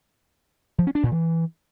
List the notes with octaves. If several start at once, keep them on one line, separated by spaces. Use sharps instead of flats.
F3
C#4
D4
A#2
E3